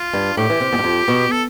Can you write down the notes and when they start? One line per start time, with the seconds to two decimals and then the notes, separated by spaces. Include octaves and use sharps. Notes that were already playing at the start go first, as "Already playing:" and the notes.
Already playing: F4
0.13 G2
0.37 A2 G4
0.50 E3
0.60 C3
0.72 E2
0.78 G2
0.84 F2
1.08 B2
1.31 A4